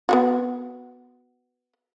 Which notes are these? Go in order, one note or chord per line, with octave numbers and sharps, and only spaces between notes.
B3 F4 F#4